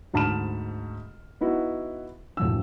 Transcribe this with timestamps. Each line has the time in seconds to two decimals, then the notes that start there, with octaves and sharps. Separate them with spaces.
0.14 D2 G#2 A5 B5 F6 E7
1.41 B3 D#4 E4 F#4
2.37 D1 F3 E6